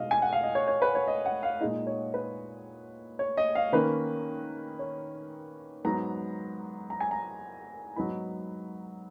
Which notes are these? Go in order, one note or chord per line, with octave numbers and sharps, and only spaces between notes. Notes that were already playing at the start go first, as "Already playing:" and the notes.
Already playing: B2 G#3 D#4 D#5 F5
G#5
F#5
F5
D#5
C#5
C#5
B4
C#5
D#5
F#5
F5
A#2 G#3 D#4 D#5
C#5
B4
C#5
D#5
F5
D#3 A#3 C#4 B4
C#5
G#2 F#3 B3 A#5
A#5
G#5
A#5
G#2 F#3 B3 D#4 B5